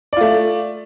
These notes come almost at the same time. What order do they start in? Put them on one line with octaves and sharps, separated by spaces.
D5 F4 A3